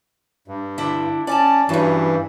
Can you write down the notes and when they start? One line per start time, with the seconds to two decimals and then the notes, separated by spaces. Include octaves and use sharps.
0.48 G2
0.78 D3 E4
1.27 C#4 D5 G#5 A5
1.69 G2 E3 F#3 C#4